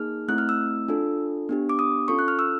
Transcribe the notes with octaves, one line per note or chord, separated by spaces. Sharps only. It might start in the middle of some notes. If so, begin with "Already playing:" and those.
Already playing: A#3 D#4 G#4 F6
A3 C4 E4 F#6
F6
E6
D4 F4 A4
B3 D4 G4
D6
D#6
C#4 F4 A4 C#6
F#6
F6
E6